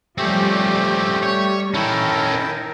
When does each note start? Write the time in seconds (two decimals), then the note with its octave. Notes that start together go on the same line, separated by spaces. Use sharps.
0.18 F3 G3 A3 C4 C#4 G4
1.23 G3 C#5
1.74 D#3 C#4 E4 A4 A#4 G5 A5